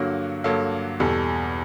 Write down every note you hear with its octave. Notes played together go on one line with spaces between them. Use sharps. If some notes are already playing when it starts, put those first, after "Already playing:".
Already playing: G2 D3 F#3 A#3 F#4
G2 D3 F#3 A#3 A4
E2 B2 G3 A4